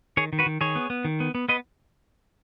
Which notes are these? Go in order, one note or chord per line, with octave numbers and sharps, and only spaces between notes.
D#3 G#4 C#5
D#3
F#4 B4
D#3
D#3 G#4 C#5
B3
B3
D#3
B3
B3
B3 B4 D#5